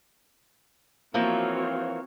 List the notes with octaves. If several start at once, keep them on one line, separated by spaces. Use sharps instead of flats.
E3 F3 A#3 C4 F#4 C#5